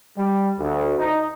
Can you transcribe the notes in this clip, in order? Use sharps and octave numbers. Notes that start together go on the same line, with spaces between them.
G3
D2
D#4